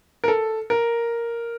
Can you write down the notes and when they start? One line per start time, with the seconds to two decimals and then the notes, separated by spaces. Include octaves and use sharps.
0.24 A#4
0.28 A4
0.70 A#4